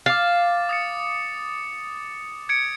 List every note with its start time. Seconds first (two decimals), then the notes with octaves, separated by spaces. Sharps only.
0.06 F5 D6 A6
0.69 D#6 A6 C#7
2.49 G#6 C#7 D7